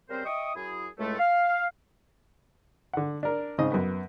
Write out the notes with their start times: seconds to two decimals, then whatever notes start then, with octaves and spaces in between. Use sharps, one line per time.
0.09 C#3 G3 C4 A#4 C5
0.25 D#5 E5 G5 C#6 D#6
0.55 F#2 E4 G#4
0.98 C#2 A2 G#3 A3
1.19 F5
2.93 D3 F#5
3.23 D4 A#4
3.58 G#2 C#3 C4 D#5 D#6
3.72 F#2 B3